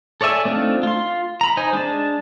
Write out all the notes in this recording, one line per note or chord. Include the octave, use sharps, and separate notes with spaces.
A4 C#5 D5 E5 G#5
A3 C4 D4 D#4 F4
F4 C6
A#5 B5
D#4 C5 G#5
G#3 D4 A5